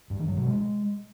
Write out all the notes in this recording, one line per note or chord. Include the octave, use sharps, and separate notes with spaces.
G2
D#3
F#3
B2
G#3